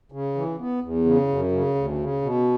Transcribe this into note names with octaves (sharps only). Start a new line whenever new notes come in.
C#3
E3
B3
E2
C#3
F#2
C#3
D2
C#3
B2